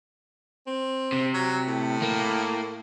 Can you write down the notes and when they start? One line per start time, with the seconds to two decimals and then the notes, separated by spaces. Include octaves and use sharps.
0.67 C4
1.13 C3
1.34 F#3
1.67 A2
2.02 A#3